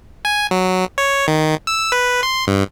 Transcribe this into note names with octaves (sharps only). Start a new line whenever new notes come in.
G#5
F#3
C#5
D#3
E6
B4
C6
G2